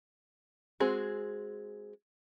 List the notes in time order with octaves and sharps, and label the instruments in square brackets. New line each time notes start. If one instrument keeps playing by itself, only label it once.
[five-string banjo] G#3 C4 F#4 G#4